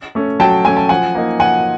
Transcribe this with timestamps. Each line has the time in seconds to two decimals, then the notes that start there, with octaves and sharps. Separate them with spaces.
0.15 A3 C#4
0.40 F#3 G5 A5
0.65 A3 C#4 G#5
0.77 A5
0.89 F3 F#5 G#5
1.15 A#3 D#4
1.40 F3 F#5 G#5